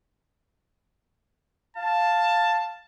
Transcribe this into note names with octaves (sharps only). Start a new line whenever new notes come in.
F5 A5